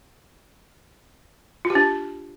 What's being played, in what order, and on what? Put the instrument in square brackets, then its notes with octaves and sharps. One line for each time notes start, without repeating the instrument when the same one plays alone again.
[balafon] F4
G4
D4